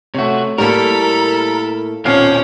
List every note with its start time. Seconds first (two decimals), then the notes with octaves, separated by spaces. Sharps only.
0.14 C3 A3 F#4 C#5
0.58 A2 G3 A#3 A4 A#4 B5
2.05 D#1 B2 C4 C#4 F4 F6 C7